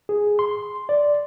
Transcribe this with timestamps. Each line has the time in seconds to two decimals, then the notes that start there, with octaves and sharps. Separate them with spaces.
0.09 G#4
0.39 C6
0.89 D5